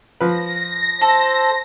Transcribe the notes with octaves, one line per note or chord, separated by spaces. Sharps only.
F3 B4 A#6
A4 C5